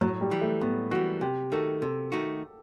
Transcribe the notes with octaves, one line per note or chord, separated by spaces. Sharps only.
A2 F#3
G3
E3 G3
A3
A2 B3
E3 G3 F#4
C3 G4
D#3 A3 D#4 F#4 A4
C3 A4
D#3 A3 D#4 F#4